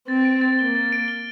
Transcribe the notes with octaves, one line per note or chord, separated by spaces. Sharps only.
C4 A6
D7
A6
A#3 G7
A6
D7
G7